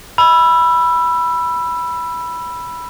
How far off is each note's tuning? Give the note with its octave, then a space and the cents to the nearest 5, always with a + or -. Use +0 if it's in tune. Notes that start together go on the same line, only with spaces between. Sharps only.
B5 -10 E6 +20